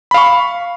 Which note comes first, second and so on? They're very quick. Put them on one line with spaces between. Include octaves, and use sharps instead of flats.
B5 F5 C#6